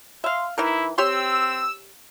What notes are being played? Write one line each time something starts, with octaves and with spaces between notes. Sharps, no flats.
E5 F5 C6
E3 D#4 E4 A#4
C4 G4 C#5 C6 E6